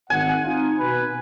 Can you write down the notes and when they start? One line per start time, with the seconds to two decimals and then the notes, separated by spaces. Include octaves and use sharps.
0.10 G#1 F#5 G#5
0.43 C4 D#4 F4
0.79 B2 B4